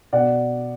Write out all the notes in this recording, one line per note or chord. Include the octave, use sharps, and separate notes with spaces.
B2 D5 F#5